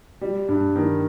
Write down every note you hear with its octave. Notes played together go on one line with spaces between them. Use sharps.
G3
G2
D#3